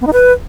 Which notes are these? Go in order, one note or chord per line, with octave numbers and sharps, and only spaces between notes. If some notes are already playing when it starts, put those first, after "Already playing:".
B3
D#4
B4